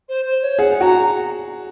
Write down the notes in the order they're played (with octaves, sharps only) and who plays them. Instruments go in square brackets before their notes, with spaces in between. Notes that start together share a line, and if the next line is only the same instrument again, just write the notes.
[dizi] C5
C5
C#5
[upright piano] G#4 [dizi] F#5
[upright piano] F#4 [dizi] A#5